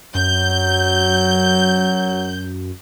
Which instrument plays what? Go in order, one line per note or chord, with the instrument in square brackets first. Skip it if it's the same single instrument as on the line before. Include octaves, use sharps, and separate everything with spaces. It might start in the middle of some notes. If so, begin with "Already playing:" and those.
[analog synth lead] F#2 [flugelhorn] F#3 [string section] G6